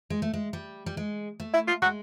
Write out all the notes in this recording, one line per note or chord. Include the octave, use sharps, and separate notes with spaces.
G#3
A3
G#3
G3
G3
G#3
A3
E4
F4
G#3 F#4